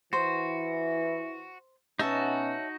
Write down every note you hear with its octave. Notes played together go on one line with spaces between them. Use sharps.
E3 E4 F#4 C5
B2 C#4 D#4 F#4 C#5 E5 A5